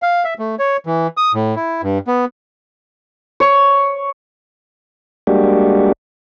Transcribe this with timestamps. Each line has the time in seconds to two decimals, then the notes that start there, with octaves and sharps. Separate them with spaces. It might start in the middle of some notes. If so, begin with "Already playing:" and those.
0.02 F5
0.25 E5
0.39 A3
0.59 C#5
0.86 E3
1.17 D#6
1.34 A2
1.56 E4
1.83 G2
2.07 B3
3.40 C#5
5.27 G3 G#3 A#3 D4 F#4 G4